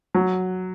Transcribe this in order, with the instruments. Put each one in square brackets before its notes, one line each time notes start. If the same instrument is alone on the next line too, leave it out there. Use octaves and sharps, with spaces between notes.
[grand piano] F#3